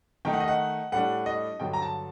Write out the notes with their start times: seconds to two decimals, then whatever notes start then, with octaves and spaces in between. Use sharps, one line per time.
0.25 D#3 A3 D#4 G5
0.33 F#5
0.40 D#5
0.48 F#5
0.92 A2 G3 D4 F#5
1.26 D#5
1.60 G2 D3 F#3 G5
1.73 A#5
1.82 A5